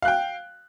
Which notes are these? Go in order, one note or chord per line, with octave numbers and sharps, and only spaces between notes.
F5 G5 F#6